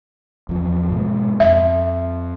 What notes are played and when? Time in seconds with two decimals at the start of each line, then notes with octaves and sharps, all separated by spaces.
0.49 E2 F3
0.90 G#2 B2 G#3
1.40 F2 E5